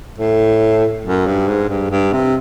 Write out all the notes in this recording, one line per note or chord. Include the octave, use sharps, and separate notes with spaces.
A2
F#2
G2
G#2
G2
G2
C3